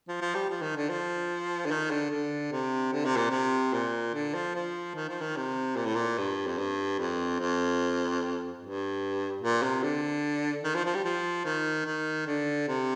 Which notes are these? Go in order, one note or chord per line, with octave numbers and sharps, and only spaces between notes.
F3
F3
G3
F3
D#3
D3
F3
D3
D#3
D3
D3
C3
D3
C3
A#2
C3
A#2
D3
F3
F3
D#3
F3
D#3
C3
A#2
A2
A#2
G2
F2
G2
F2
F2
G2
A#2
C3
D3
D#3
F3
F3
G3
F3
D#3
D#3
D3
C3